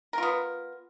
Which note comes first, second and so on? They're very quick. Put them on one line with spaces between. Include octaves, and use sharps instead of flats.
A#4 F4 B3